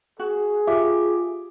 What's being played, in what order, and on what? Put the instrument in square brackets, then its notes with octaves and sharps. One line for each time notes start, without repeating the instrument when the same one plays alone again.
[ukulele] F#4 [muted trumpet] G#4
[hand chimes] F4 G4 D6 [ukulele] E5